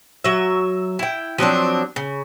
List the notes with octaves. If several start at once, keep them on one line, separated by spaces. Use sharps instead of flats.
F#3 E5
E4 G5
F3 F#3 C4 D4
C#3